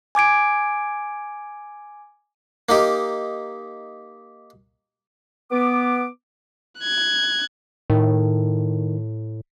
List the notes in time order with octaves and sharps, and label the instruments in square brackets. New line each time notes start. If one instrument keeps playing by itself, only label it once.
[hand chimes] G#5 D6 G#6 D7
[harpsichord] A#3 D#4 G4
[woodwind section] B3 D6
[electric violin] F#6 G#6
[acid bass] A2 [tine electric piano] D#3